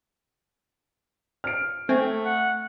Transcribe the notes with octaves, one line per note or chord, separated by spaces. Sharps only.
F6 D7
A3 C4 G5 G#5
F#5